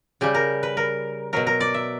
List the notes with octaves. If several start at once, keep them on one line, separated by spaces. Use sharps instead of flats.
C#3 G3 G4
A#4
B4
A#4
B2 F#3 A#4
A#4
D5
E5